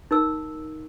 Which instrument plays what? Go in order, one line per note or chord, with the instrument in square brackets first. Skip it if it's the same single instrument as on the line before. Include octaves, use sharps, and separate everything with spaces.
[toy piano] D#4 A#4 E6